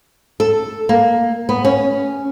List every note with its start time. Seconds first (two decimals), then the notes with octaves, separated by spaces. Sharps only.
0.40 A4
0.89 A#3
1.49 B3
1.65 C#4